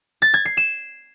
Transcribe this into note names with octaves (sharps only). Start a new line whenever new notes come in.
A6
G#6
C7
E7